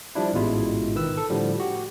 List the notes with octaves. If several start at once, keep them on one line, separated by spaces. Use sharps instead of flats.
F3 G3 D4 E4
A1 G#2 B2 G#3 E4 F4
D#3 B4 E6
A4
A2 D3 F3 G3
F#4 G4